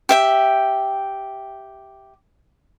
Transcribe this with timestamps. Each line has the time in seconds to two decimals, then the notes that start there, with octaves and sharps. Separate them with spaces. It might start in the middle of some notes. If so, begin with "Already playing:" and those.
0.09 G4 E5 G5